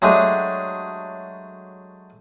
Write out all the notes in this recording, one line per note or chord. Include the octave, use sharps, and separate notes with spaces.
F#3 G#3 A3 D4 G4 G#4